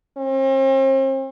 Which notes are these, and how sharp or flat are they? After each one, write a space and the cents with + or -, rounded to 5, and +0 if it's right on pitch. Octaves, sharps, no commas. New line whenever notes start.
C4 +40